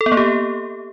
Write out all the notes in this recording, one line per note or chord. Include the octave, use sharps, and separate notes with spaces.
A4
B3
A#3
G4